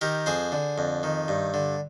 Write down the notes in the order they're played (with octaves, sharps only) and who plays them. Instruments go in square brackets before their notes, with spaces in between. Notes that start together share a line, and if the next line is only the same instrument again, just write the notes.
[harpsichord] D#3 G4 A#4
F2 G#4 C5
D3
F2
D#3
G2
D3